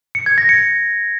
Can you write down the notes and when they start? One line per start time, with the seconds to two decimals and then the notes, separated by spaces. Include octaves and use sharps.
0.15 C#7
0.26 G#6
0.38 A#6
0.49 C#7